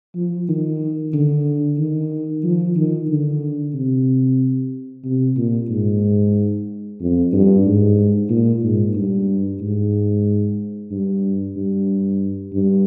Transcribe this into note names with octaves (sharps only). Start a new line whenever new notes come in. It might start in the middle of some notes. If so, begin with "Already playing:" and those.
F3
D#3
D3
D#3
F3
D#3
D3
C3
C3
A#2
G#2
F2
G2
G#2
A#2
G#2
G2
G#2
G2
G2
G2